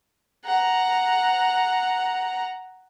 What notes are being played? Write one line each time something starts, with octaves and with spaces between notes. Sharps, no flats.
F#5 A#5